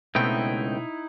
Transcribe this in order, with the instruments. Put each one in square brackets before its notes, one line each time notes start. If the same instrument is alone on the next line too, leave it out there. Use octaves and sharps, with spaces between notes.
[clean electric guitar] C#2 G5 [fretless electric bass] B2 [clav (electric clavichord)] A3 B3 C4 [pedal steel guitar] D#4 E4